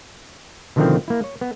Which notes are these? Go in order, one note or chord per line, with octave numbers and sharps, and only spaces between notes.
B2 D3 D#3 F3 A3 C4
A#3 E4
C#5
B3